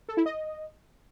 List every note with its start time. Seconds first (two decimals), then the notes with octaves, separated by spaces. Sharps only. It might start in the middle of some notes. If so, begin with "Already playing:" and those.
0.09 A4
0.17 E4
0.26 D#5